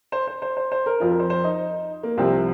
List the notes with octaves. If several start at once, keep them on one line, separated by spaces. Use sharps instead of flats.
C5
C5
C5
C5
C5
A#4
F2 F3 F4
A#4
C5
C5
D#4
A#3
C2 C3 F3 C4